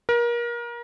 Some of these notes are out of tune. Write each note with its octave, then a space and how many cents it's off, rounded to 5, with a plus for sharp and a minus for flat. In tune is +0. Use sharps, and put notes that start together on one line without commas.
A#4 +30